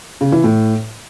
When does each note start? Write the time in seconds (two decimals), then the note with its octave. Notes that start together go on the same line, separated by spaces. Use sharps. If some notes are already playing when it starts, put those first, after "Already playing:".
0.21 C#3
0.32 E3
0.44 A2